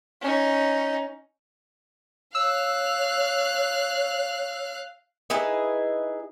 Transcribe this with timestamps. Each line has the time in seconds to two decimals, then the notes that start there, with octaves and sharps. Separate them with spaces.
0.21 C#4 D#4
2.35 C#5 F5 E6 F#6
5.30 D#4 E4 G#4 B4